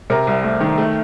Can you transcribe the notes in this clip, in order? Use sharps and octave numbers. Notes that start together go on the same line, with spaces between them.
C3 A#4 A#5
C2
A3
D#3
A3